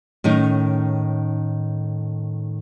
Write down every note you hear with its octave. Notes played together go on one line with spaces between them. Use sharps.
A2 D#3 C#4 D#4